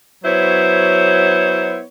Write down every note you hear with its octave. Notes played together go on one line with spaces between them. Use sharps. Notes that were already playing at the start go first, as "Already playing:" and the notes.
F#3 B3 E4 C5 C#5